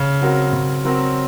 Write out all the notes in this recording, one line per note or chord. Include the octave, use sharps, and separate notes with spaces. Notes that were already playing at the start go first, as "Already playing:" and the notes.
Already playing: C#3
F#3 C4 F#4 A#4
C#3
F#3 C4 F#4 A#4